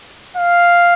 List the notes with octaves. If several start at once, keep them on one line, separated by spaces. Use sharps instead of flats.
F5